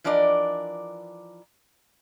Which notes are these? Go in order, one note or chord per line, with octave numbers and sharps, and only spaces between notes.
E3 F3 D4 A#4 D5 D#5